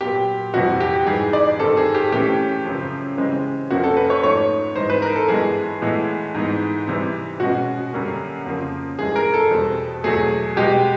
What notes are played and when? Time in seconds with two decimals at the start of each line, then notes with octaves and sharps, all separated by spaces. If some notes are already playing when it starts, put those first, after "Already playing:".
0.01 A#2 F#3 B3 G4
0.54 F2 C3 E3 G3 F#4
0.80 G4
1.07 G#2 E3 G3 G#4
1.33 D5
1.59 G2 D#3 G3 C4 A4
1.77 G#4
1.94 G4
2.12 A2 E3 A3 C#4 G4
2.65 F#2 C#3 F3
3.18 C#3 E3 G#3 C4
3.70 F2 C3 F3 A#3 C#4 F#4
3.84 A4
3.97 B4
4.10 C#5
4.23 G#2 F3 A3 C#5
4.76 G#2 E3 G#3 C4 C5
4.90 B4
5.02 A#4
5.16 A4
5.28 G2 E3 G#3 B3 G#4
5.82 A2 E3 G#3 B3
6.34 G#2 E3 G#3 B3
6.87 C3 E3 G3 C4
7.40 B2 G#3 C#4 F#4
7.93 F#2 D3 G3 A#3 C#4
8.46 F2 C#3 F3 A#3
8.99 G2 E3 G#3 G#4
9.16 A#4
9.34 A4
9.51 E2 B2 G3 C4
10.04 E2 B2 F#3 A3 G#4
10.56 B2 G#3 B3 G4